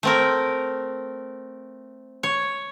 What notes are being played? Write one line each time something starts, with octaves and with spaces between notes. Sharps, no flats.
A3 C4 A#4
C#5